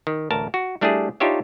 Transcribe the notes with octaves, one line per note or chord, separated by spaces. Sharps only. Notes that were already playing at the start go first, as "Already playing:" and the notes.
D#3
A1 D2 A#4 A5
F#4
G3 A3 D4 E4 G4 G#4
D4 D#4 F4 G4 C#5 E5